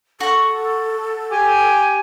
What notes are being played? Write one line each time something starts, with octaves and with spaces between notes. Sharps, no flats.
F#4 A4 C#6
G4 G#5